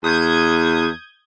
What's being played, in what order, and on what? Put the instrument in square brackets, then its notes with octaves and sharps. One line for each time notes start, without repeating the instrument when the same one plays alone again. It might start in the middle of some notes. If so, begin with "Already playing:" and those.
[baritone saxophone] E2 [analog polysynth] D#6 G6 G#6